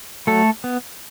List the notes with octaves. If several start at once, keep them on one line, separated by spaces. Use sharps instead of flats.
F#3 A3 A4
B3